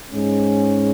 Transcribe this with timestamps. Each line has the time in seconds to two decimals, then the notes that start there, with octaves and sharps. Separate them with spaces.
0.11 G#2 G#3 C#4